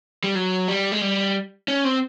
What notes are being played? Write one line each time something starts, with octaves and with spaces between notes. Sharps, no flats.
G3
F#3
G3
G#3
G3
C#4
C4